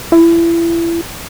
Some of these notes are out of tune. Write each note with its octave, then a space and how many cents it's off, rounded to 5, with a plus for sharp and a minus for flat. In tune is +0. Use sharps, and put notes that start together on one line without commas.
E4 +30